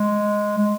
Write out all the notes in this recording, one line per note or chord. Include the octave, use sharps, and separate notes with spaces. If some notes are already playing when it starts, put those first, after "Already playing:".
Already playing: G#3
G#3